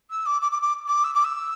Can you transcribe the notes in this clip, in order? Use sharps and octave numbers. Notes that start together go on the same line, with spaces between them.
E6
D6
D6
D6
D6
D6
E6
D6
E6